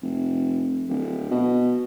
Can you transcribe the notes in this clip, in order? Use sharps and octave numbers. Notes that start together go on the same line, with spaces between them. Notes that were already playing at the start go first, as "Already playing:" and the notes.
F1
D1
B2